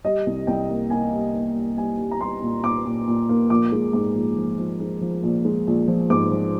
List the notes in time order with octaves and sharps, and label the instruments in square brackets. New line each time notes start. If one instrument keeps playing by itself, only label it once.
[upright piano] G3 D#5
C2
C2 G5
A#3
A#3 G#5
G3
A#3
G3
G3 G#5
G3
A#5
G3 C6
A#2
A#2 D6
A#2
A#2
A#3
A#1 D6
G#3
G#2 D6
A#1
F3
F3
G#3
F3
A#1
G#3
A#1
F3
G#2 D6
F3